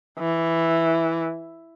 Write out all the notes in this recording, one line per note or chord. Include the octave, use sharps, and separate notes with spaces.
E3